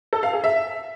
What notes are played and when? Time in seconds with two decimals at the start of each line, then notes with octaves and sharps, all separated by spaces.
0.13 A4
0.23 F5
0.33 G#4
0.44 E5